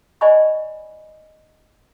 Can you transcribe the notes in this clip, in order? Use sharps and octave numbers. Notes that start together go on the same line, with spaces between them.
C5 D5 D#5 G#5 B5 C#6